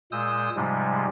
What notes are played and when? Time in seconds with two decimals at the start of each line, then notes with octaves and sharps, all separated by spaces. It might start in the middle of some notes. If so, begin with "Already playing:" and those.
0.12 A#2 G#3 D#6 E6 G6
0.56 G#2 C3 F3 G3 G#3